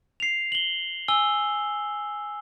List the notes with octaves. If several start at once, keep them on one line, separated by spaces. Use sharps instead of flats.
C7 F7
F#7 G7
G#5 E6 G7